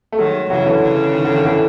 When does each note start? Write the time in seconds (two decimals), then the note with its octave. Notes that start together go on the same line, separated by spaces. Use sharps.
0.12 A3
0.18 D#3 F#3 G#3
0.50 C#3 E3 F#3
0.66 D3 E3
0.82 C#3
1.13 D#3
1.24 D3
1.34 D#3
1.45 D3 E3